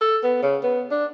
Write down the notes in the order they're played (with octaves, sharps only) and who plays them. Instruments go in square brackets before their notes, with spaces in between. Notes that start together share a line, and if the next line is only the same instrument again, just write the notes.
[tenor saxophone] A4
B3
C#3
B3
D4